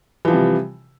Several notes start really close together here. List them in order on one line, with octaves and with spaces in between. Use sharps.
E3 F3 G3 C3